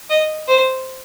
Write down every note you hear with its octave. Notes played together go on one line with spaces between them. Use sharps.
D#5
C5